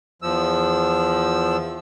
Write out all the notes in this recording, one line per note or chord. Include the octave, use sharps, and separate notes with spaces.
E2 F3 E6